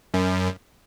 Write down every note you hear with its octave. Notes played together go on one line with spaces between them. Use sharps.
F#2